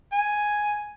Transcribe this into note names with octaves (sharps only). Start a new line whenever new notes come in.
G#5